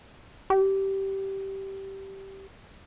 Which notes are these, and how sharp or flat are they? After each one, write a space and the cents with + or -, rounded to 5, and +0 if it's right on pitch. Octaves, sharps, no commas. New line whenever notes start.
G4 -15